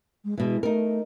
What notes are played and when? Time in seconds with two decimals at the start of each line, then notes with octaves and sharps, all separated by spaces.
0.24 G#3
0.38 B2 E3 G#3
0.63 A3 D#4 A#4